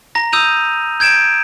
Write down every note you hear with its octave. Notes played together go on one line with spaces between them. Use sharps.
A#5 A#6
D#6 E6 G6 D#7 F7
G6 G#6 D7 E7